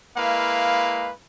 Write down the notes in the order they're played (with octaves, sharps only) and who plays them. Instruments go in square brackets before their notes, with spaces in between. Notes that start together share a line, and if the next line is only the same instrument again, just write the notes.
[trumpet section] G#3 A#3 E4 B4 F5